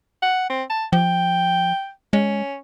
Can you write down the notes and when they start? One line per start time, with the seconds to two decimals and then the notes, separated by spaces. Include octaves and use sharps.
0.22 F#5
0.50 C4
0.70 A5
0.93 F3 G5
2.13 G#3 C#4